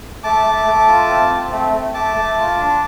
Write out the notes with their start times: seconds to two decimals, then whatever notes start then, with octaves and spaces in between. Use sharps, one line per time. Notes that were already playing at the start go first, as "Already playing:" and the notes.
0.23 A3 A5 D6
0.46 A3
0.67 A3
0.88 F4
1.09 C4
1.30 C4
1.52 A3
1.73 A3
1.94 A3 A5 D6
2.16 A3
2.38 F4
2.59 D4